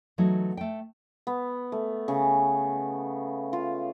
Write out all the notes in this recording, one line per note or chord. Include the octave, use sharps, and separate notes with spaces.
E3 F#3 A3 D#4
A3 G5
B3
A3
C#3
F4